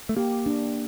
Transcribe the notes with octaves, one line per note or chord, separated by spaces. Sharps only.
A3
A#3 G4
D4